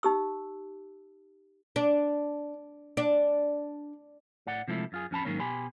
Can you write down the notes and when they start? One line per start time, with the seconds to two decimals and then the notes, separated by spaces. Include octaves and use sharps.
0.03 D#4 G4 E6
1.76 D4
2.97 D4
4.47 A2 D5 F#5
4.68 C3 F3 G#3 A3 E4
4.92 F#2 F4 G#4
5.11 F2 C#4 A5 B5
5.25 G#2 C3 D#3 F#3 A#3 C#4
5.40 B2 G4 G#5 B5 C6